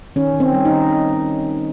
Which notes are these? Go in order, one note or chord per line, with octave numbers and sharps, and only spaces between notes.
D#3 C#4
D#3
C4
G3
D#4
D#3